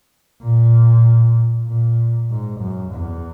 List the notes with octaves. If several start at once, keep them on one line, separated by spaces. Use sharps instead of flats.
A#2
A#2
G#2
F#2
E2